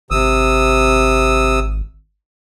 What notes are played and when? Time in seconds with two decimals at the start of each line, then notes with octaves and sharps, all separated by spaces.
0.11 G#1 C3 D#6 E6